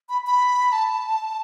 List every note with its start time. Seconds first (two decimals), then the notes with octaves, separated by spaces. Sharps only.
0.09 B5
0.27 B5
0.72 A5